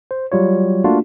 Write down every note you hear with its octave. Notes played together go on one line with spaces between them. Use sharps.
C5
F#3 G3 F4 C#5
A3 A#3 D4 F4 F#4